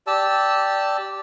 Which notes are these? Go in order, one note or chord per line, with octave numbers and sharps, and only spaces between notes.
G4 D5 A5 E6